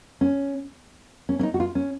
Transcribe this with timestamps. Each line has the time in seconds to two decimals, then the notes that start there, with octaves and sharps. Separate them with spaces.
0.21 C#4
1.29 C#4
1.39 C#4
1.43 D#4
1.54 F#4
1.60 F4
1.75 C#4